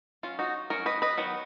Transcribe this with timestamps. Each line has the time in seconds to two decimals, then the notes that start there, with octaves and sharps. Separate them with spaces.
0.23 F#3 C#4 F4
0.39 D#4 F#4
0.70 F#3 C#4 A#4 C#5
0.86 B4 D#5
1.02 B4 D#5
1.17 D#3 F#3 B3